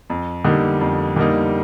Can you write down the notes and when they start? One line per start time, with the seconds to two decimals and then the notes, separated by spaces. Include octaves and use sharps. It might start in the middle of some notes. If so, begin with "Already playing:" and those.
0.10 F2
0.45 D3 G3 A#3 D#4
0.81 F2
1.16 D3 G3 A#3 D#4